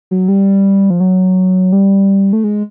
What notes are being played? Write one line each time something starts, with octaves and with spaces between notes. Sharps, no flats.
F#3
G3
F3
F#3
G3
A3
G#3